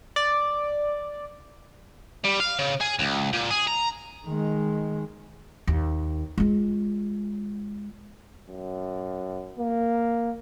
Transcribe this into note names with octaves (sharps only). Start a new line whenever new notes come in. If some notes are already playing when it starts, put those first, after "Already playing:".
D5
G3
F5
C#3
G#4
C#2
A#2
G#4
A#5
D#3 G#3
D#2
G#3 F4
F#2
A#3